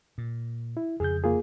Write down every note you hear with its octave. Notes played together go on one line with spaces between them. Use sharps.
A#2
E4
F2 C#3 G#4 G6
A#3 F4 G#4